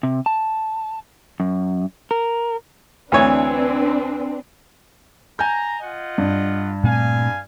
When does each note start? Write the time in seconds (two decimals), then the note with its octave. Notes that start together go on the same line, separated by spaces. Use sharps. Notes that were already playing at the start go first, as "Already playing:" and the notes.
0.03 C3
0.26 A5
1.40 F#2
2.11 A#4
3.12 D2 E3 C4 D4 B4 C#5
5.39 G#5 A#5 G6
5.80 F4 D#5 F#5
6.18 G2
6.84 A#2 A3 C4 F5 G#5